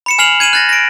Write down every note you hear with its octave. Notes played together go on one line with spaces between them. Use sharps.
B5 C#7 E7
G#5 F6 C7 F7 F#7
G#6 D#7 E7 F#7
F#6 A6 A#6
A#6 D7